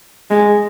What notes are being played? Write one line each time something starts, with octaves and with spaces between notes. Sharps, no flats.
G#3